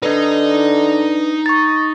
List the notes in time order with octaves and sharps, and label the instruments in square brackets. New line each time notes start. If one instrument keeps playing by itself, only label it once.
[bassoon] D3 [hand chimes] D4 B4 [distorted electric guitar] D#4 D#5
[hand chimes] C#6 A6